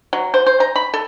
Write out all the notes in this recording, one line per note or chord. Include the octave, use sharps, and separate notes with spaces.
F#3
C5
C5
A#5
B5
A4